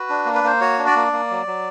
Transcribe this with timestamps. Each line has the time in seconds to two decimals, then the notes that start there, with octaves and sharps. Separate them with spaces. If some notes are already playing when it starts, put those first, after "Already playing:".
Already playing: F#4 B4
0.10 D4
0.26 A#3
0.35 B4
0.44 A#3 C5
0.61 F#4 C#5
0.78 D4
0.87 D5
0.96 A#3
1.13 A#3
1.30 F#3
1.47 F#3